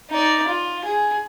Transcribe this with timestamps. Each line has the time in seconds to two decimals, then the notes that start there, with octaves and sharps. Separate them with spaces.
0.11 D#4 D5
0.48 F4
0.85 G#4